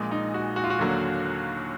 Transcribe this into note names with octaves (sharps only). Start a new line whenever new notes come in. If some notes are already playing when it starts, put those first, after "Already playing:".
Already playing: A#1 A#2 G#3
D#4
F#4
F#4
F4
F#4
D#2 D3 F#3 A#3